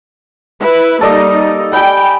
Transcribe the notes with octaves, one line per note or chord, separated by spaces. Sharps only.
E4 B4
G3 A#3 D#4 A4 D5 D#5
G3 G5 G#5 B5